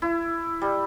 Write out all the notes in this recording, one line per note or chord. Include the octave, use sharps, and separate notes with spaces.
E4
G3